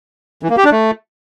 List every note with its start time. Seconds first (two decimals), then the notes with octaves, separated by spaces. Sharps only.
0.43 E3
0.50 A#3
0.57 G4
0.64 D4
0.72 A3